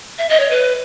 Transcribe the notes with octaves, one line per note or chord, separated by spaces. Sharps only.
E5
D#5
C#5
B4